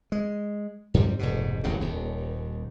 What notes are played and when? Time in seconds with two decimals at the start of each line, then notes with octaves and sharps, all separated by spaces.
0.12 G#3
0.94 F2 G#2 C3 G3
1.19 F1 G#2 B2
1.63 D1 A1 F#2 C#3
1.80 D#1 D#2